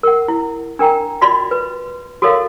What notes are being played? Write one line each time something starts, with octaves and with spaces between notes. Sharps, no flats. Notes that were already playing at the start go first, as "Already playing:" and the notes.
A#4 F#5
E4
D4 A#4 G5 A#5
F4 F#4 D5 D#5 B5 C6
B4
F#4 A4 A#4 C#5 D#5 F5